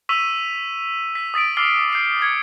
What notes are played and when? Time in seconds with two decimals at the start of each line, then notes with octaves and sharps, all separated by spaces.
0.09 C#6 E6 B6 D#7 F7
1.15 B6
1.34 D#6 A6 B6 D7
1.57 D6 E6 F6 A6 C7 G7
1.93 G6 C7
2.22 G#6 C#7